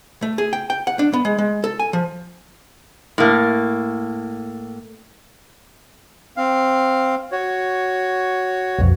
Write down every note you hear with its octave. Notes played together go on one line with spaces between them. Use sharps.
A3
G#4
G5
G5
F#5
D4
B3
G#3
G#3
A4
G#5
F3
A2 A#3
C4 F5
F#4 C#5
B1 F2